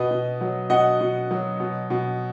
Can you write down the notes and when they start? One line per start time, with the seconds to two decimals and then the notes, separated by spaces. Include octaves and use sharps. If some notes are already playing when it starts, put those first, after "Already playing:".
Already playing: B2 B4 D#5
0.11 B2
0.41 F#3
0.70 B2 D#5 F#5
1.01 B2
1.31 F#3
1.60 B2
1.90 B2